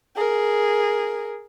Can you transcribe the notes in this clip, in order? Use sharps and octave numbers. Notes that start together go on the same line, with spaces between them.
G#4 A#4